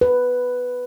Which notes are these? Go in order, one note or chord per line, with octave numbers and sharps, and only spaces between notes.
B4